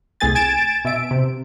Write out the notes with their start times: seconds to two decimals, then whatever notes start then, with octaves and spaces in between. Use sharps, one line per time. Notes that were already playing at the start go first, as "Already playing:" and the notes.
0.20 C2 A3 G#4 G#5 A6
0.35 G#5 G#6 A6 D7 E7
0.85 B2 E5 D7
1.11 C3